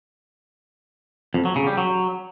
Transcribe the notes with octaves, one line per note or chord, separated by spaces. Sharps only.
F2
F#3
C#3
G3
F#3